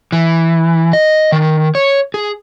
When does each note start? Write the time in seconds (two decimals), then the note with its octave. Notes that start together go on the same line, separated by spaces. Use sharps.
0.12 E3
0.93 D#5
1.32 D#3
1.75 C#5
2.14 G#4